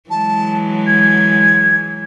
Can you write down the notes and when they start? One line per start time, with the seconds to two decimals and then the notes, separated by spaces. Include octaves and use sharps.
0.10 E3 F#3 G#3 A5
0.87 G#6